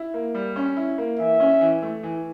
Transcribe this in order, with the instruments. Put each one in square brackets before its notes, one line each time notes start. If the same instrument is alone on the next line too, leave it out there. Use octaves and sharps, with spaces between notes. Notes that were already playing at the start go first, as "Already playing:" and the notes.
Already playing: [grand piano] E4
A#3
G3
C#4
E4
A#3
[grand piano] E3 [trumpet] E5
[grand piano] C#4
E3
A3
E3